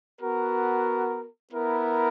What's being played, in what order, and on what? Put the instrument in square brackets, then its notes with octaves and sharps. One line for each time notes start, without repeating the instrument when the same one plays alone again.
[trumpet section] B3 F#4 A#4
B3 E4 A#4